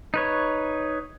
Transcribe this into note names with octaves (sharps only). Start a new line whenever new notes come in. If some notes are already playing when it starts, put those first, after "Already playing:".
D#4 B4 C#5